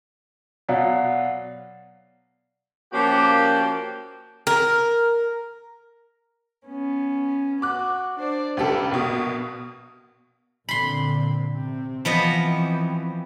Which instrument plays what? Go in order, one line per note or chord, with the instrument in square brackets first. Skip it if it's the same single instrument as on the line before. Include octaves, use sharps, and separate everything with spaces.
[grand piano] B2 F#3 [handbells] D5 F5 F#5
[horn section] F3 A#3 C#4 F#4 G4
[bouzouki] A#4
[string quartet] B3 C#4
[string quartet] F#4 [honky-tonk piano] D6 F#6
[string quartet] D4 C5 D5
[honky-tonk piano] C#2 G4 A4 [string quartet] B2 G3
[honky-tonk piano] A#1 B2 [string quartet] A#3 F#4
[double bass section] A#2 D3 C4 [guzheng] B5 C6
[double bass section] C3 C4
[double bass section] E3 C4 [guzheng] F3 B3 D#5